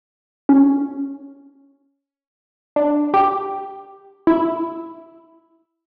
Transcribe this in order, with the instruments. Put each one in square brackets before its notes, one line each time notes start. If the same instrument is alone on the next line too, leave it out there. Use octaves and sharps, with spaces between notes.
[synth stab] C#4
D4
G4
E4